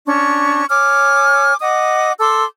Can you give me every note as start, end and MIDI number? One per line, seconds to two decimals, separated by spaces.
0.05 0.64 61
0.05 0.64 62
0.05 0.64 85
0.69 1.54 73
0.69 1.54 80
0.69 1.54 86
0.69 1.54 89
1.61 2.11 75
1.61 2.11 78
1.61 2.11 86
1.61 2.11 87
2.19 2.43 69
2.19 2.43 84
2.19 2.43 86
2.19 2.43 88